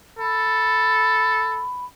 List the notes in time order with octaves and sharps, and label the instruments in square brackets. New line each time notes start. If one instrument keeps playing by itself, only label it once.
[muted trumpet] A4 [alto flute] B5